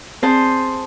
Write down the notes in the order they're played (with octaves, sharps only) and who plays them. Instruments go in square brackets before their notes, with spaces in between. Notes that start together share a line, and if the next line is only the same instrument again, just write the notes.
[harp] C4 G#4 C5 A5